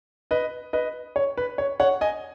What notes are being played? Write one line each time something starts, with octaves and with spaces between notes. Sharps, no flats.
B4 D#5
B4 D#5
C#5
B4
C#5
C#5 F#5
D#5 G#5